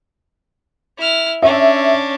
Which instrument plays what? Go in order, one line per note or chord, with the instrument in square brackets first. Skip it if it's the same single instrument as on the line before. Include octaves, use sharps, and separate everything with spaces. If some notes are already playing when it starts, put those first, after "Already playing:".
[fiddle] E4 F6
[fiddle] C#4 D4 [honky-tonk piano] E5